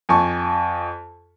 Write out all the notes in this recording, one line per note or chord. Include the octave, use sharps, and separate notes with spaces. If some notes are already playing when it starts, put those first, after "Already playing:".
F2 G#5 A5 C#6